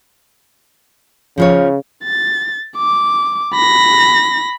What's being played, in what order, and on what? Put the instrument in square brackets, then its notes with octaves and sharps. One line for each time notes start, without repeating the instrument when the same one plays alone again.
[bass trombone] C#3 [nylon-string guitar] F3 F4 C#5
[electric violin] A6
D6
B5 A#6